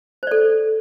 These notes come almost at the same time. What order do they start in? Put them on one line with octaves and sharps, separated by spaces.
C5 D5 A4